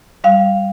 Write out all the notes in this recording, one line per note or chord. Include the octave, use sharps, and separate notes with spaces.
G3 F5